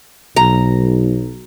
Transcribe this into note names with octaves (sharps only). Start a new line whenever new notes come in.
B1 A#5